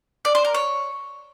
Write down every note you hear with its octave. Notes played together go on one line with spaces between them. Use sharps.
D5
C5
A#4
C#5